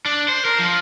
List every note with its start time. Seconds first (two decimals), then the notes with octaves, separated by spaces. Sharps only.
0.05 D4
0.29 C5
0.45 A#4
0.59 F3